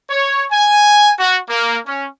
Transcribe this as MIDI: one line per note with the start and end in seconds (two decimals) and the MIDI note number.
0.10 0.45 73
0.52 1.11 80
1.19 1.38 66
1.49 1.78 58
1.87 2.06 61